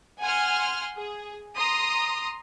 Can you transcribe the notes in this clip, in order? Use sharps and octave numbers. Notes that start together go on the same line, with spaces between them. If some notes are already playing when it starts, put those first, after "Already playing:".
F#5 G#5 C6 F6
G#4
A#5 C6 D#6